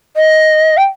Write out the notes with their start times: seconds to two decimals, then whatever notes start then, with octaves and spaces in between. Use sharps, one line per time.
0.16 D#5
0.77 G5